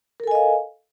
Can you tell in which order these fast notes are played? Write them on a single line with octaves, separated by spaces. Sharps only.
A#4 A4 G#5 D#5 F5